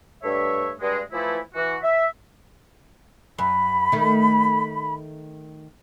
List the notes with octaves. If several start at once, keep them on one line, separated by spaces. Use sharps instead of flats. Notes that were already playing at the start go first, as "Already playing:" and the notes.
G2 A3 C#5 E5
G2 G#3
E3 F3 A3 E4
E3 F#4
E5
F#2 B5
D#3 A3